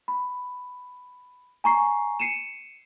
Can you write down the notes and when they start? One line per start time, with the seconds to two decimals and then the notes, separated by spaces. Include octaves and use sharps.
0.08 B5
1.64 G#5 A#5 C#6 C7
2.20 C7 C#7 D#7 E7